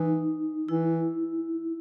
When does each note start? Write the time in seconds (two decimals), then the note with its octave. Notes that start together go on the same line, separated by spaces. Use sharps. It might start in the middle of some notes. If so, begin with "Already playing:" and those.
Already playing: E3 D#4
0.69 E3 E4